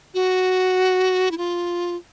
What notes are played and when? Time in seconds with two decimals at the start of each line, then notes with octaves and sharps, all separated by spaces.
0.14 F#4
1.31 E4
1.38 F4